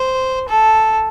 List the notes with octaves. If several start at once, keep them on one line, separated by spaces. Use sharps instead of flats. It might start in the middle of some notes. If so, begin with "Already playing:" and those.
Already playing: C5
A4